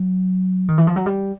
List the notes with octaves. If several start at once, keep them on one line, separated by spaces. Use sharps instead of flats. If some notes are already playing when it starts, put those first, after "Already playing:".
Already playing: F#3
D#3
E3
F3
F#3
G3